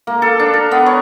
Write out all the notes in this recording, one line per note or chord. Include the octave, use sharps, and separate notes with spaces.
A#3
A4
D4
A#4
B3
C#5